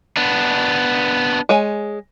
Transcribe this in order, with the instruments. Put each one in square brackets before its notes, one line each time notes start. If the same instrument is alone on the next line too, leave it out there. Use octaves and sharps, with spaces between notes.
[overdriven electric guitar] B3 D4
[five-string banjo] G#3 C#5 G#5